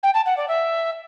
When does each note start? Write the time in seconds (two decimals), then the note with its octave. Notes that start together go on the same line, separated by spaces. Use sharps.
0.03 G5
0.14 A5
0.25 F#5
0.37 D5
0.48 E5